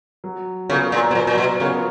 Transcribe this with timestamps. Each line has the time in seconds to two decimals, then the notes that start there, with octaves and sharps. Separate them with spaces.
0.24 F#3
0.69 C#3 B3 F4 A#4 C#5
0.92 A#2
1.11 B2
1.15 A#2 F#3
1.27 A#2
1.38 B2
1.60 C#3 B3 F4 A#4 C#5